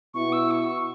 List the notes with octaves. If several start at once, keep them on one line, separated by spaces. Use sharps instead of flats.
B2 B3 E4 C#6
E6
C#6
C#6